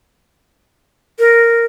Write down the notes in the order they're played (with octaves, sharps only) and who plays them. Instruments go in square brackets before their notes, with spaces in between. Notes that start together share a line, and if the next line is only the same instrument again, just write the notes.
[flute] A#4